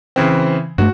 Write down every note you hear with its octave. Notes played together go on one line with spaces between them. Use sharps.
C#3 E3 C4
G2 G3 A3 F#4